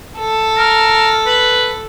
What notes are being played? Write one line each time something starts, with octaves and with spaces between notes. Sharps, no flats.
A4
A#4
B4